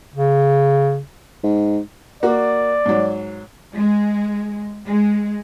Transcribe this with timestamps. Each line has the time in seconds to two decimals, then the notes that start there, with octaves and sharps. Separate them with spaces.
0.15 C#3
1.43 G#2
2.23 A#3 F#4 D5
2.86 G#2 F#3
3.74 G#3
4.86 G#3